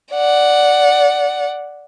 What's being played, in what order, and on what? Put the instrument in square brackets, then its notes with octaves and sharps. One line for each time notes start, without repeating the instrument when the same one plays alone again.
[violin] D5 F#5